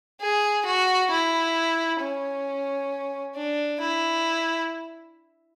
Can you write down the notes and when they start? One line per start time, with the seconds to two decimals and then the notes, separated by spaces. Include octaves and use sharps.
0.21 G#4
0.65 F#4
1.11 E4
2.00 C#4
3.36 D4
3.80 E4